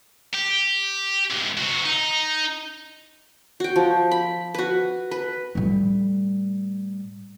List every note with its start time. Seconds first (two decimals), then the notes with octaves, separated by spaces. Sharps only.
0.34 G4
1.30 C2 G#2
1.58 C3 F#4
1.85 D#4
3.60 F#4 G5
3.76 F3
4.11 B5
4.54 F#4 B4
5.11 B4
5.55 A2 G3